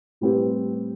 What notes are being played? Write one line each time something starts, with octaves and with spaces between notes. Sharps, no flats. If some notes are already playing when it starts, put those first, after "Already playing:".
A2 G3 C4 G4 B4